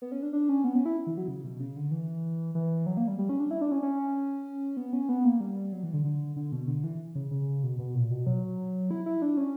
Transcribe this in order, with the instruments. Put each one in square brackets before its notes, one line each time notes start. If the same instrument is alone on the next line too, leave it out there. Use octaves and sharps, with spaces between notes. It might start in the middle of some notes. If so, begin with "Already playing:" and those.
[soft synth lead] B3
C#4
D4
D4
C#4
B3
C#4
E4
E3
F#3
C#3
B2
C#3
D3
E3
E3
F#3
A#3
G3
G3
C#4
D4
E4
D4
C#4
C#4
B3
C#4
B3
A#3
G3
F#3
E3
D3
D3
D3
B2
D3
E3
C#3
C#3
B2
B2
A#2
B2
F#3
E4
E4
D4
C#4